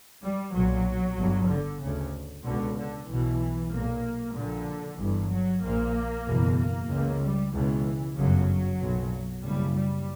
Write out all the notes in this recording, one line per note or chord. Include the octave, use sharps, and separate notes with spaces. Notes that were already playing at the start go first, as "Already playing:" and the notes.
G3
B1 A#2 F#3
G1 G2
D3
D2 C#3
C#2 B2 D3
D3
B1 B2 E3
B1 A#2 A#3
A#1 A#2 D3
G1 G2 E3
F#3
A#1 A#2 A#3
F#1 E2 B2
A#3
C#2 C#3
G3
C#2 B2 E3
G1 F#2 C#3 F#3
B1 A#2
F#1 F#2 C#3 G3
G3